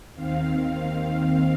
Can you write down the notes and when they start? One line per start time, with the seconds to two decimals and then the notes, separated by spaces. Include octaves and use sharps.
0.14 D#2 D#3 C4 F5
0.60 F5